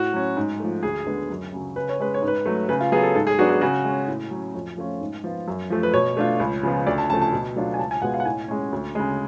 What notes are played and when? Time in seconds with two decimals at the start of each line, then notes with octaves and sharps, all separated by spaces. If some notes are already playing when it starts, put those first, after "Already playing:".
Already playing: A2 F#4
0.13 F#3 C#4
0.37 G#2
0.60 F3 A3
0.83 D2 G#4
1.07 D3 G#3 B3
1.30 F#2
1.53 C#3 F#3
1.76 C#3 B4
1.89 C#5
1.99 G#3 C#4 B4
2.14 C#5
2.22 G#2
2.28 B4
2.46 F#3 A3
2.69 C#3 B4
2.81 F4
2.92 F#3 B3 F4 G#4
3.03 A4
3.15 G#2 A4
3.27 G#4
3.38 F#3 B3 D4 F#4
3.50 G#4
3.61 C#3 F#4
3.85 G#3 C#4
4.08 A2
4.31 F#3 C#4
4.55 F2
4.77 F3 A3 C#4 F4
5.01 G#2
5.24 F3 B3 F4
5.48 F#2
5.70 F3 A3
5.83 B4
5.93 B2 C#5
6.17 A3 D4 F4
6.40 C#2
6.63 C#3 F3 B3 F4
6.87 D2 D5
6.98 A5
7.10 C#3 F3 A3 A5
7.22 A5
7.33 B2
7.56 F#3 A3 D4 F4
7.74 G#5
7.79 C#2 A5
7.91 G#5
8.02 B2 G#3 B3 F4 F#5
8.14 F5
8.20 F#5
8.25 A2 G#5
8.48 G#3 C#4
8.72 D2
8.95 C#3 G#3